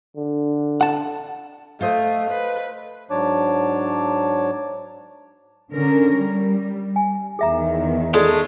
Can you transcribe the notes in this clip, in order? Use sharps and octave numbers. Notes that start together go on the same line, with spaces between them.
D3
F#5 A5
A3 F4 C5 D#5
B4
G#2 F#3 D4 C#5 A5 D6
D3 C#4 A#4
G3
G#5
E2 D#3 G#4 E5 A#5
G#3 A3 F4 D5